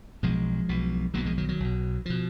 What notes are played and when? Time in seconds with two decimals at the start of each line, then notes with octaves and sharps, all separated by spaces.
0.23 B1 B2 F3 G#3
0.69 B1 B2
1.14 B1 B2 F#3 A#3
1.26 F3 G#3
1.38 D#3 F#3
1.49 D#3 F#3
1.60 B1 B2
2.06 B2 F3